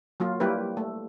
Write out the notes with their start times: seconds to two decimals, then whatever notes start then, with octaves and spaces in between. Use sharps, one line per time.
0.20 F#3 A#3 F4
0.40 G3 A#3 E4 G4 B4
0.77 A3